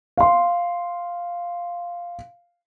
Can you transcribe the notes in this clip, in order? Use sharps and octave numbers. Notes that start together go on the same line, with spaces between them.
F5 C6